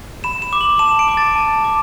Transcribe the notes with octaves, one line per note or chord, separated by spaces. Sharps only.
B5 E7
E7
D6
F#7
A5 E7
D7
D6
A6
A5
D6